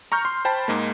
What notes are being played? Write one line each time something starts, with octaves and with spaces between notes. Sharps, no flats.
A#5 C#6 F6 G6
C6
C5 G5 A5 B5
G#2 G#3 A#3